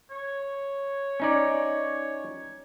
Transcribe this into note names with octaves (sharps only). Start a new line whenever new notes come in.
C#5
C#4 D#4 D5